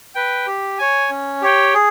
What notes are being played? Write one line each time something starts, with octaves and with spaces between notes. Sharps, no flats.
B4 G5
G4
C#5 G#5
C#4
G4 C#5 G5
G#4